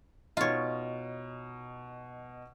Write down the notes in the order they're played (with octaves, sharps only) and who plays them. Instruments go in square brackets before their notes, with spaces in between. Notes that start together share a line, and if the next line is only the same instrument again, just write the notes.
[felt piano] B2 D#4 [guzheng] F4 C#5